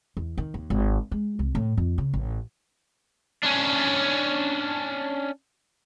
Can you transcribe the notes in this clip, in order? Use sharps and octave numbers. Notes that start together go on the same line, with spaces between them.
E2
D#3
D#2
G#1
G#3
C2
A2
F2
C#3
A1
C#4 D4